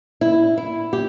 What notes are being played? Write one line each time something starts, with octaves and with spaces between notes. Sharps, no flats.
E4
E4
G4